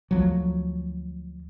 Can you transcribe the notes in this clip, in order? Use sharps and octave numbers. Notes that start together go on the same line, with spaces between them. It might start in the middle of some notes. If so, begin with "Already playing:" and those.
D2 F3 F#3